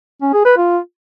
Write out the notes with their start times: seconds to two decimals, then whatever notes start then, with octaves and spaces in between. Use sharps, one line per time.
0.22 C#4
0.34 G#4
0.45 B4
0.57 F4